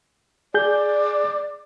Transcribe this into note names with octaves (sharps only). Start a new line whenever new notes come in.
G#4 D5 G6